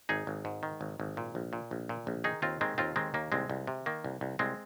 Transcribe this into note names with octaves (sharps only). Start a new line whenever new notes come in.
G#1 D#4 G#4
G#1
G#2
D#3
G#1
G#1
A#2
A#1
A#2
A#1
A#2
A#1
D#3 D#4 G#4
D#2 C4 F4
D#3 G#3 C4
D#2 C4 F4
D#3 G#3 C4
D#2 A#3
C2 G#3 C4
C2
C3
D#3 A#3
C2
C2
C2 G#3 C4